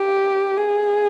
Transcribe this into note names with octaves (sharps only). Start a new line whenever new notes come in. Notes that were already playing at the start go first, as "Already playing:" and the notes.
Already playing: G4
G#4